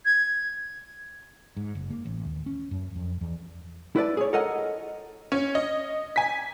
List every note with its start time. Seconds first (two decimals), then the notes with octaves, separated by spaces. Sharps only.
0.05 G#6
1.57 G#2
1.75 F#1
1.90 A#3
2.05 A1
2.25 D#2
2.46 C#4
2.71 F#2
2.96 F2
3.21 E2
3.96 E4 B4 D5 A5
4.17 G#4 C#5
4.33 A4 A#4 D#5 F#5 G#5
5.32 C#4
5.55 D#5
6.16 G#5 B6